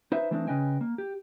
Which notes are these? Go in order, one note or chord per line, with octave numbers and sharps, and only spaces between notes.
D#4 B4 C5 E5
E3 A3 C4 D4 D#4
C#3 C#4 B4 D#5 G5 G#5
A#3
G4